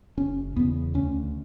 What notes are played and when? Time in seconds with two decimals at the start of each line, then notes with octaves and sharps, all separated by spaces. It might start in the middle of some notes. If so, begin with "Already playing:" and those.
0.17 F#1 C#4
0.56 E2 C#3 B3
0.94 D2 C#4